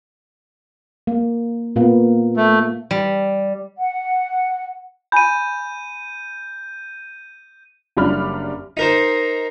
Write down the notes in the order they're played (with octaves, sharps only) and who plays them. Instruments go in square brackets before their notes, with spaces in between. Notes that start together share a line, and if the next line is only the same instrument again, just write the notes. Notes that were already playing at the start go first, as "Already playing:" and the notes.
[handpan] A#3
A#2 A#3 B3
[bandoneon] A3
[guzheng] G3
[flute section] F#5
[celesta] G#5 B5 [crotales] G6 D#7
[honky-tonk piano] F#1 F#3 G3 D4 B5 F6
[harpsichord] D#4 A#4 C5